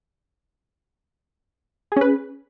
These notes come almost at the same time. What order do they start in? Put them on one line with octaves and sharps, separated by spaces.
G#4 C#4 B4